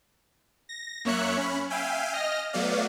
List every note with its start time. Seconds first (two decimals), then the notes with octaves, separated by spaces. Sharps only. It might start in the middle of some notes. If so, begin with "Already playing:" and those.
0.69 A#6
1.05 F#2 A#3 C#5 E5 F#6 C#7
1.37 C#4 B5
1.70 E5 F5 G5 G#5
2.13 D#5 F6 A#6
2.53 F#3 A3 B3 D5 F5